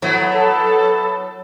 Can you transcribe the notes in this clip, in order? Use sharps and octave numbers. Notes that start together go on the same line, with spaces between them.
F#3 A3 B3 E4
A4 C#5